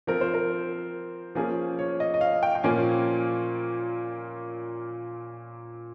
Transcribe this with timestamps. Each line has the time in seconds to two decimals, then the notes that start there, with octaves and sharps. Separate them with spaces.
0.07 F3 C4 A#4
0.21 C5
0.34 A#4
1.35 F3 A#3 C#4 G#4
1.79 C#5
2.00 D#5
2.14 D#5
2.21 F5
2.43 G5
2.55 G5
2.63 A#2 F3 A#3 C#4 G#5